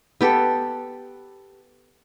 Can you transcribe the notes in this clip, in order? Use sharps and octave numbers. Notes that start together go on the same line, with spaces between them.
B3 G4 A4